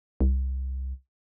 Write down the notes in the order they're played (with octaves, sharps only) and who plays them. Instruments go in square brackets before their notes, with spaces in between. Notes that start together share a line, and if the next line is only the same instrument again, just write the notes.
[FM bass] C2